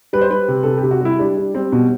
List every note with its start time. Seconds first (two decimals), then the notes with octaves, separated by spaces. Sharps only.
0.13 G3 B4
0.21 C5
0.30 G3 B4
0.48 C3
0.63 C3 A4
0.78 G4
0.83 C3
0.91 F#4
1.01 G3 E4
1.19 G3 D4
1.37 G3
1.54 G3 C4
1.72 B2